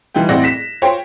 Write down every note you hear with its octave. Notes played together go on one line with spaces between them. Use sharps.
E3 G3 D#4 F4 G4
A1 C4 E4 D5 F#5 A#6
B6 E7
F4 C5 C#5 G5